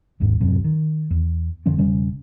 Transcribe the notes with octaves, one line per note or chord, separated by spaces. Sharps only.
G#1 D#2 G#2
D1 F#2 C3
D#3
E2
F1 D3 F3 C#4
E1 C#3 G3 C#4